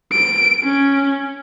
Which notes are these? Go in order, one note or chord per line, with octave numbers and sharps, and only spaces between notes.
D7
C#4